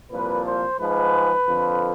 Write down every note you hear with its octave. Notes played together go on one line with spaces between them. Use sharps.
C2 A#2 F3 B4
C5
G#2 F3 G#3 B4
F2 D3 F3